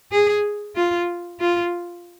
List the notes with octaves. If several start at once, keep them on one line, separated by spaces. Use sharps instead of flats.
G#4
F4
F4